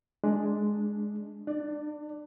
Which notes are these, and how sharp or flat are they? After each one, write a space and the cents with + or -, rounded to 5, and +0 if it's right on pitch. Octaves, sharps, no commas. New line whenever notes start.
G#3 +5 D4 +0
D4 +35 D5 +0